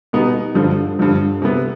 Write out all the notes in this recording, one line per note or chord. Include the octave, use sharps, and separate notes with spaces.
B2 G3 B3 D#4
G2 D3 F3
G2 D3 F3
C3 G3 B3